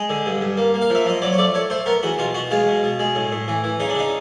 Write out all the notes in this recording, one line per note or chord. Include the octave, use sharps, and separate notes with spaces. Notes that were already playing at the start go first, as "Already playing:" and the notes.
Already playing: G#3 D#5
D3
G2
G2
A#3
A#3
F5
F3 E5
F3 D#5
F#3 D5
C#5
A3 D5
A3 C#5
A3 C5
B3 A#4
E2 F#4
B2 F4
B2 F#4
G#3 F4
B2
B2
G#3
A2
A2
E3
E3
C#3 D#4
D4
C#3 D#4